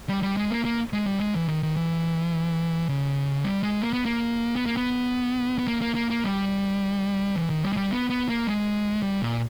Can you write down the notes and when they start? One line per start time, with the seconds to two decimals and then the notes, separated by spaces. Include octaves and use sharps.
0.09 G3
0.23 G3
0.37 G#3
0.51 A#3
0.65 A#3
0.93 G#3
1.07 G3
1.20 G#3
1.34 E3
1.48 D#3
1.63 D#3
1.76 E3
2.89 C#3
3.44 G3
3.63 G#3
3.82 A#3
3.93 B3
4.05 A#3
4.56 B3
4.66 A#3
4.77 B3
5.59 B3
5.68 A#3
5.81 A#3
5.95 A#3
6.10 A#3
6.24 G3
7.36 E3
7.50 D#3
7.63 G3
7.72 G#3
7.77 G3
7.91 B3
8.10 B3
8.29 A#3
8.48 G#3
9.02 G3
9.21 A#2